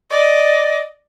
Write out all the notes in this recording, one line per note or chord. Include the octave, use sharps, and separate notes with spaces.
D5 D#5